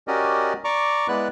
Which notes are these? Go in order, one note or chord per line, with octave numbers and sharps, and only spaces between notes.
C#4 F#4 G4 A#4 D5 D#5
D5 A#5 C#6 D6
G#3 B3 E4 B4 D5 F#6